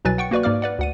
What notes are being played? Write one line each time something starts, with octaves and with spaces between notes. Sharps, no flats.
C2 B2 F#3 B4 G#5 A6
F#5 G5 C#6 C#7
A#3 F#4 B4 D5 C#6
G#2 A#3 D5 F5 D6 F6
B4 D5 F#5
D2 F#5 D#7